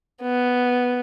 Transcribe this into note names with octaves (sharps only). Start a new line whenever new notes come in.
B3